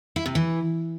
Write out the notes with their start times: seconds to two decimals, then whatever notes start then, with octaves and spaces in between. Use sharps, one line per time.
0.16 E4
0.26 C3
0.35 E3